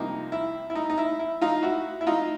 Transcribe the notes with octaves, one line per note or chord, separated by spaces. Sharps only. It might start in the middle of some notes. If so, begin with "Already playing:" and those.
Already playing: C2 C3 F3 A#3 D4 D#4
E4
E4
D#4
D#4
E4
E4
D#4 F4
E4 F#4
E4
D#4 F4